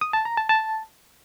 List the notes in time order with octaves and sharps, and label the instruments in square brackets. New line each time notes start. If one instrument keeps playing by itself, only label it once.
[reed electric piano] D#6
A5
A#5
A5
A5